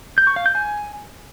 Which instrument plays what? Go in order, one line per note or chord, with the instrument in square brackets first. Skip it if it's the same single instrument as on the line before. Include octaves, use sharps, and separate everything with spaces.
[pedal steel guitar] G6
C#6
F5
G6
G#5